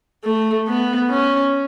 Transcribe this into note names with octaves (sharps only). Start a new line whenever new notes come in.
A3
B3
C#4